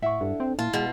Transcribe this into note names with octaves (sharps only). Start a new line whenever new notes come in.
A2 E4 E5 F#5 C#6
G2 D4 A4
C4
A#2 E4 F4 A5
B2 G#3